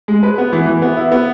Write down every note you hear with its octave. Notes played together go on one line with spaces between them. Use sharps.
G#3
B4
B3
E3
E3
B3
E4
B3